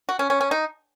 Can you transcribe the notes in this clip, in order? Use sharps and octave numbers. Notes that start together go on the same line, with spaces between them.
F#4
C#4
C#4
C#4
D#4